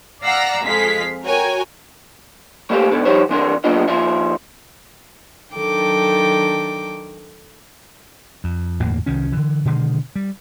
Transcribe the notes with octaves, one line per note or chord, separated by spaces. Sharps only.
D5 F5 F#5 A#5 E6 A#6
F2 G#3 F5 B6
F#4 A#4 C#5 G5 G#5
A3 A#3 C4 G4 F5
G#2 B2 D3
F3 G3 D#4 G4 C5 C#5
E3 C4 D4 A#4
F#3 A#3 B3 D4 F4 D#5
D#2 F3 F4 E5
D#3 F#3 D4 A4 G5 D6
F2
G1 E2 A2 A#3
C2 D#3 C#4
D3 E3
B2 D3 D#3 G#3
G3